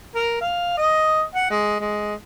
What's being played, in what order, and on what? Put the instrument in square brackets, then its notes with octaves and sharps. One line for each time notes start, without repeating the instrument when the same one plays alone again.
[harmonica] A#4
F5
D#5
F#5
G#3
G#3